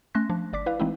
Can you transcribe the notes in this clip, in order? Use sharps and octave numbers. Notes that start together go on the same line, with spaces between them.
A3 C#4 C6 F#6 A#6
F3 D4
G1 D5 D6 B6
E4 B4 F5
E3 G#3 A3 C4 D#4 E4